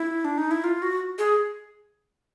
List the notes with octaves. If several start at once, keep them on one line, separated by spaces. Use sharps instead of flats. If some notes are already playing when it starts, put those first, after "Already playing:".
Already playing: E4
D4
D#4
E4
F4
F#4
G#4